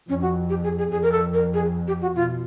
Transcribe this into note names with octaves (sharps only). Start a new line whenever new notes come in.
F2 C#4
F#4
G4
G#4
G#4
F2 G#4
A#4
A4
A#4
G#4
G4
F#4
B2 F4